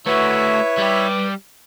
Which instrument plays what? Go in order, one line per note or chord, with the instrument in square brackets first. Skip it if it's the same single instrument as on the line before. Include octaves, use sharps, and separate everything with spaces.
[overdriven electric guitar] A3 F#4 [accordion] E4 C#5 E5 [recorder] B4
[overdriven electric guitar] G3 G4